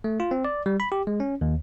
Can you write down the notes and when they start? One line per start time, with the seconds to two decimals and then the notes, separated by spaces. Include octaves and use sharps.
0.04 A3
0.20 F4
0.31 C4
0.45 D5
0.66 G3
0.80 B5
0.92 G4
1.07 G#3
1.20 C#4
1.41 D#2